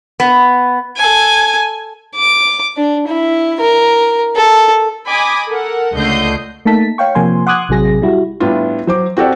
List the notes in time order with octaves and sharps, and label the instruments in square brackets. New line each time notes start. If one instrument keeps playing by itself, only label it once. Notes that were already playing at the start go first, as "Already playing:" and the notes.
[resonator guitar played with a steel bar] B3
[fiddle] A4 G#5
[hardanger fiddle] D6
D4
E4
A#4
A4
[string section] D#5 G#5 B5 D6 D#6
A4 A#4 F#5
C#2 D3 A3 D#5 G6 C7
[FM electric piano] A3 A#3 D#4 A5 B6
C#5 F5 G5 C#6
C3 F3 A#3 G#5 C6
F#5 C6 D6 D#6 F#6 G#6
A1 C3 F#3 G#4 A#6
G3 E4 F#4
[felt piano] A2 G3 B3 D4 E4 F4
F#3 C5 D6
C4 F#4 G4 A4 D5